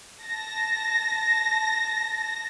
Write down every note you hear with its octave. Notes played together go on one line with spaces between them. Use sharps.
A5 A#6